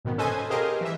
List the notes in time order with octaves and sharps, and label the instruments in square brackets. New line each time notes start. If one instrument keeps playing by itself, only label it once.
[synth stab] G#2 B2 D#3 B3
C#4 A4 B4 C5 D#5 G#5
G4 G#4 A#4 C5 D#5 F5
E3 E5